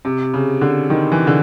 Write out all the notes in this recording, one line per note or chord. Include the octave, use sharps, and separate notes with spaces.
C3
C#3
D3
D#3
E3
D3